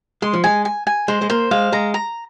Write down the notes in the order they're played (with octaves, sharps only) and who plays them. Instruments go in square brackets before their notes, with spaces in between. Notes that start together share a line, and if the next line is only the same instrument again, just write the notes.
[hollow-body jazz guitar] G#3 [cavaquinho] C6
[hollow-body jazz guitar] F3
[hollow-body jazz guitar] G#3 [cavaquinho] G#5
[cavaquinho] G#5
G#5
[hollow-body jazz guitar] G#3 [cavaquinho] C5
[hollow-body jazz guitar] G#3
[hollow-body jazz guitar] A#3 [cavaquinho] C5
[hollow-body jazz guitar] G#3 [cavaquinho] F5
[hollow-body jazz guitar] G#3 [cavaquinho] A#5
[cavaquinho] A#5